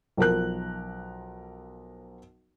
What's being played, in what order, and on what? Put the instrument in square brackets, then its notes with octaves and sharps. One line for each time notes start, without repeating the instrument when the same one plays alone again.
[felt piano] B1 F3 A#4 F#6